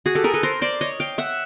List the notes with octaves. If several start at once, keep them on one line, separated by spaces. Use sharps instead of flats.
F#4 G#4
G4 A4
G#4 A#4
A4 B4
A#4 C5
C5 D5
C#5 D#5
F5 G5
E5 F#5